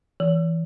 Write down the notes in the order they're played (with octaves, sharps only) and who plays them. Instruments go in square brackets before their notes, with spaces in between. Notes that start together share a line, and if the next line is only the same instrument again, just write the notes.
[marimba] E3